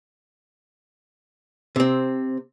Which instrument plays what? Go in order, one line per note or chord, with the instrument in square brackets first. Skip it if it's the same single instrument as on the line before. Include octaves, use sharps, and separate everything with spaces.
[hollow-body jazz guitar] C3 C4